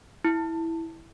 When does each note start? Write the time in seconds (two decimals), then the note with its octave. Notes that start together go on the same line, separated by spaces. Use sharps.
0.24 E4